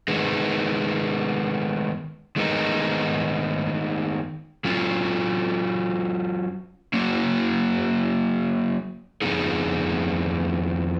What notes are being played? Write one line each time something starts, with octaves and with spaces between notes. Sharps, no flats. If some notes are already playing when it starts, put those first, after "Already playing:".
D#3 G#3 B3
D#3 G#3 B3 D#4 A#4
F#3 C#4 F4
F#3 A#3 C#4
F2 F3 B3 D#4 G#4